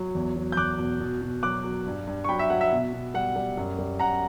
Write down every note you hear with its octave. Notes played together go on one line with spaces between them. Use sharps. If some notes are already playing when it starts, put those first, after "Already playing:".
Already playing: F#3
E2
F#3
G6
E2 D6 F#6
B2
B2
B2
F#3 D6 F#6
F#3
G2
G2
C#6
F#3 G5 B5
E5
F#3 F#5
E5
B2
B2
G3 F#5
G3
F#2
G3
F#2 F#5 A#5